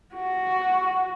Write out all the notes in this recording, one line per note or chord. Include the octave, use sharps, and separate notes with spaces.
F#4